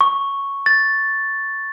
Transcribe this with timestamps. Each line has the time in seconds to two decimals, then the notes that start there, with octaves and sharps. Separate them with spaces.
0.01 C#6
0.66 A6